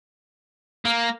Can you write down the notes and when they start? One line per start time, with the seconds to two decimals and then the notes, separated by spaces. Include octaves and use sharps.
0.85 A#3